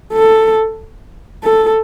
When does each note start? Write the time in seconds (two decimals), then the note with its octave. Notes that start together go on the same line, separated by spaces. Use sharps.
0.13 A4
1.44 A4